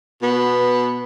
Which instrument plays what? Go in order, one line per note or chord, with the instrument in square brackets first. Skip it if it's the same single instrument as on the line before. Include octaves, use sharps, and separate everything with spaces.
[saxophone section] B2 B3